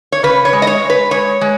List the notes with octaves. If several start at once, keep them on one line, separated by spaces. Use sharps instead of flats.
C#5
C#3 B4
C#5
G#3
D#5
C#5
G#3
B4
G#3 C#5
G#3